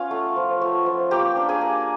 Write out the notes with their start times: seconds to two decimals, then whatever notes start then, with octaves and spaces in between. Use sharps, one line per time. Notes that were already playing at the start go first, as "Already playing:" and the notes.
Already playing: B3 C#4 F4 F5
0.11 A3
0.36 F3
0.61 A3
0.86 F3
1.11 A#3 G4 G5
1.37 D4
1.49 G#4 G#5
1.61 A#3